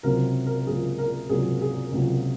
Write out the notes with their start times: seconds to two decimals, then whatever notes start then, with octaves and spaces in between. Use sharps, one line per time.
0.03 C#2 C3 F#3 A#4
0.46 A#4
0.66 C#2 C3 F#3 G#4
0.98 A#4
1.29 C#2 C3 F#3 G#4
1.61 G#4
1.92 C#2 C3 F#3